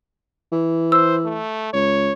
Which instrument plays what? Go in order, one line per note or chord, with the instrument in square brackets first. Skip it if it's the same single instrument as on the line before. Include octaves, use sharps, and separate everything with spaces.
[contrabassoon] E3
[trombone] C5 [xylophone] E6
[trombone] A3
[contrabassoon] C#2 [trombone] C#5